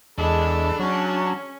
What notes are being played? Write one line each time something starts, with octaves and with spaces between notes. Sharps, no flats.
E2 G#3 D4 A4 B5
F#3 C#4 F#4